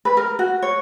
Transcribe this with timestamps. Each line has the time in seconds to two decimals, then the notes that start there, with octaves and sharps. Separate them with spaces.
0.05 B4
0.17 A#4
0.39 F#4
0.62 C#5